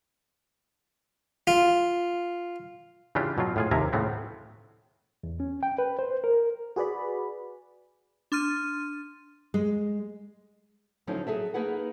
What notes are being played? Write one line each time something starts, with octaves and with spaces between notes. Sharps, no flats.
F4
C#3 E3 D4 F4 G4
B2 F#3 F4
A2 F4 G#4
D#2 C3 A#4 E5 G#5 A#5
A2 C#3 B3 C4
E2
C#4
G5
B4
C5
A#4
F#4 G#4 B4 D5 B5
D4 C6 F6 D#7
G#3
D3 F3 F#3 C#4 D#4 E4
F#3 G#4 A4 E5
A#3 D#4 G#4 B4 F#5